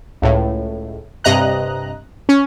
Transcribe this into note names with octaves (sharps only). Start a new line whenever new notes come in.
C#2 A2
G2 C3 D#5 A#5 F#6
C#4